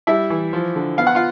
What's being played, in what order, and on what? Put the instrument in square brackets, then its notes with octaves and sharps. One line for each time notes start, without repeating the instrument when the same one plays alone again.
[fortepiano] G3 E4 E5
E3
F3
D3
B3 F5
F#5
F4 F5